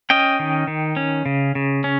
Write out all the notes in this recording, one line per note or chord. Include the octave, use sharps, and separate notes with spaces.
C#4 D#5 G5
D#3
D#3
C#4
C#3
C#3
C#4